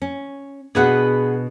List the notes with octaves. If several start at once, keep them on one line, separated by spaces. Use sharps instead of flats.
C#4
B2 B3 D4 G#4 B4 F#5